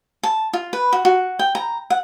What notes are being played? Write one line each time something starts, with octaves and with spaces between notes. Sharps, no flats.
A5
F4
B4
F#4
F#4
G5
A#5
F#5